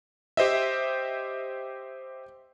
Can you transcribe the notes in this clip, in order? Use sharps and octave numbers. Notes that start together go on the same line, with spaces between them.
G4 C5 D#5 E5